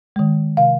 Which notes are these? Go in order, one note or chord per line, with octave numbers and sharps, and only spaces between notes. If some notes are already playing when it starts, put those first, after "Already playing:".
D#3 G#3
C3 F5